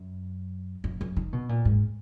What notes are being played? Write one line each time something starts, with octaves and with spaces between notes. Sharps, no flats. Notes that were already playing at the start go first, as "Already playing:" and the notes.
Already playing: F#2
F#2
F#2
D#3
B2
A#2
G#2